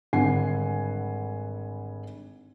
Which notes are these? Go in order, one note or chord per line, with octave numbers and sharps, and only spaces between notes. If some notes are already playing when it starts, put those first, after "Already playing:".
G#1 D3 G3 F#5 G#5 C7